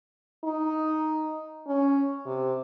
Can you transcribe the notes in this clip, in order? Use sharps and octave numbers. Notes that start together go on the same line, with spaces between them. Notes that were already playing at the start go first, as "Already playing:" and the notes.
D#4
C#4
C3